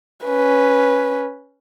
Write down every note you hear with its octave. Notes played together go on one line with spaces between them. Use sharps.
C#4 B4